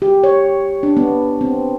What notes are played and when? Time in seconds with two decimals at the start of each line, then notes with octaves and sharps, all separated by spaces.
0.02 G4
0.24 C#5
0.83 D4
0.97 B3
1.41 C4